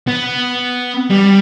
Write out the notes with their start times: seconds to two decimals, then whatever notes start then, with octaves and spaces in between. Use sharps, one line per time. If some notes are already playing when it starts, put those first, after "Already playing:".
0.08 B3
1.10 G3